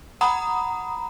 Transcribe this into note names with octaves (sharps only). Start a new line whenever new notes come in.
F#5 A#5 B5 D#6